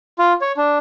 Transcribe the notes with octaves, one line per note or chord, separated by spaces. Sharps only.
F4
C#5
D4